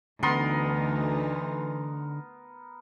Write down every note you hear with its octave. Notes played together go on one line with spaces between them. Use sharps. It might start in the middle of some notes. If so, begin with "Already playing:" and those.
D2 D3 E3 B3 D#4 A#4 C6